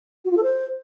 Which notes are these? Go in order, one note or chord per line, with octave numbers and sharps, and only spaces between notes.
F#4
F4
A4
C5